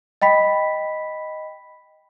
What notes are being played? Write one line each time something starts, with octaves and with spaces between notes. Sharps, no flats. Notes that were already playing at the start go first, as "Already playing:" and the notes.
D#5 G5 B5 B6